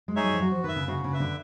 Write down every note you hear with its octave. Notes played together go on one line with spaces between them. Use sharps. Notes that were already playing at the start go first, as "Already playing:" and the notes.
G#3
D#4 G#4 C#5 E5
G3
F3
F#3 F#4
F3
D#3 B4 E5
C#3
C#3 F#4
C#3
B4 E5
D3